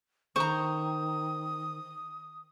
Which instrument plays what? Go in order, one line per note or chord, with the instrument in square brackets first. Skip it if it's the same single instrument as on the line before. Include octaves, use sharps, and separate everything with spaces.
[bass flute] D#3 [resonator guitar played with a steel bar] C5 A#5 [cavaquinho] C#6 [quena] D#6